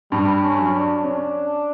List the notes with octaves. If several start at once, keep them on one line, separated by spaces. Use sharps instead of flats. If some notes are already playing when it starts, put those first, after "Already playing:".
G2 G3
C#4
F#3
D4
C#4